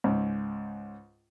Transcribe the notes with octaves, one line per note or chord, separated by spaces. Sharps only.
C#2 G#2